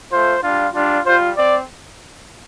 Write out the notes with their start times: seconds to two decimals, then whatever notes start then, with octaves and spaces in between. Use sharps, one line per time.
0.11 A3 F4 C5
0.43 G3 D4 F4
0.74 G3 D4 F4
1.06 G3 F4 C5
1.37 C4 D5